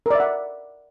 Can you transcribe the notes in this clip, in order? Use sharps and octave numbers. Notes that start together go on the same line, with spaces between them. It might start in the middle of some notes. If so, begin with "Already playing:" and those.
A#4 D5 E5 F#5